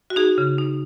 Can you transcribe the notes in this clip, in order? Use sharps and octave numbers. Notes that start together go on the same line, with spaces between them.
F#4
D#4 G#4
C#3
D#4